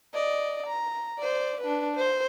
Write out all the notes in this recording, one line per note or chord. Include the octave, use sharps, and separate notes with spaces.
D5 D#5
A#5
C5 D5
D4 B4
C5